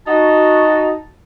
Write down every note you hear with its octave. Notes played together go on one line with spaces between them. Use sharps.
D#4 F#4 A5